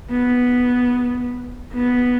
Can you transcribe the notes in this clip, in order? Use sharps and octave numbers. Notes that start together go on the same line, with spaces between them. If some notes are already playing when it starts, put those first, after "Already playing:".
B3
B3